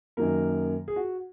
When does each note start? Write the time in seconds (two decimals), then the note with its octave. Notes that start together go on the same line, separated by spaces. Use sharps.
0.17 F#2 D#3 F#3 A#3 A#4
0.88 G#4
0.96 F#4